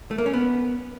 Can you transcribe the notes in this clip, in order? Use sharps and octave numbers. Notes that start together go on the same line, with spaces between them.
A3
A#3
C#4
B3